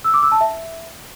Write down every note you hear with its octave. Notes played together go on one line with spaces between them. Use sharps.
E6
D6
E6
A5
E5